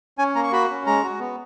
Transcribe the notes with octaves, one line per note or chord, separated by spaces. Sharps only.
C#4 G#5
A#3 A#5
C#6
F#4 B5
C#4
G#3 A#5
F#4
B3